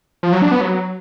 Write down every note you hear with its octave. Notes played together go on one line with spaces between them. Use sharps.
F3
F#3
D4
B3
F#3